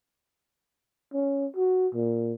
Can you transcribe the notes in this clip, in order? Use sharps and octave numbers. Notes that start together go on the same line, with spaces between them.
C#4
F#4
A#2